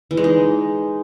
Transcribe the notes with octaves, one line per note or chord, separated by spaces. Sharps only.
E3
G#3
D#4